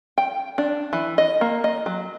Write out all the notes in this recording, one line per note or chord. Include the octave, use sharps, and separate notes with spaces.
G5
D4
E3
D#5
A#3
D#5
F#3